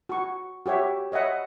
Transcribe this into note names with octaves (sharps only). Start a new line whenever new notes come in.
F#4 C#6
F#4 G4 C#5 E5
C#5 D#5 E5 F#5